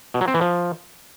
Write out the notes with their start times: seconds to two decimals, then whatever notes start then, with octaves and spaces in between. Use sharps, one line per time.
0.14 B2
0.21 F#3
0.28 C4
0.34 E3
0.41 F3